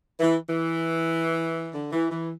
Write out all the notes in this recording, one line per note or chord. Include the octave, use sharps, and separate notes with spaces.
E3
E3
D3
E3
E3